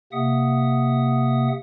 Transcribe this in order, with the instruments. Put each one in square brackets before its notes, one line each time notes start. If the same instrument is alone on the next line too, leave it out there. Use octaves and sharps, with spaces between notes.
[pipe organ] C3 A#3 E5 F#5 D#6